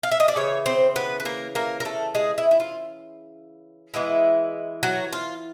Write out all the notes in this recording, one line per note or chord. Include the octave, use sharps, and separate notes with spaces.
F5
E5
D#5
D5
C#3 E3 C#5
C4 C5
B3 B4
B4
A#3 A#4
A#3 A#4
A#4
A3 A4
G#3 G#4
E4
E4
F4
E3 G#3 B3 E4
F#3 F#4
F4